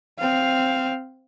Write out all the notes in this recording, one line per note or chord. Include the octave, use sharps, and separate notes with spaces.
C4 F5